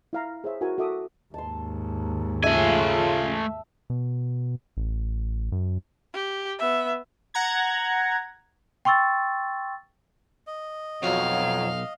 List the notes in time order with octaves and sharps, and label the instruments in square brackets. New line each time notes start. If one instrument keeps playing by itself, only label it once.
[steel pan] E4 F5 A#5
G#4 C5 C#5 E5
E4 F#4 A#4 G#5
F#4 A4 E5 D6 D#6
[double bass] D#2 G#2 [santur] A5 C6
[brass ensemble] C#3 F4 [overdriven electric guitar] A3 G#5 [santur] E5 F5 A5
[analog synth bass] B2
A1
F#2
[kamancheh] G4
B3 E5
[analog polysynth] F#5 A#5 G#6
[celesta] G5 C6 C#6 E6 A6
[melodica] D#5
[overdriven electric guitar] B1 [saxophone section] F2 F#3 [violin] F5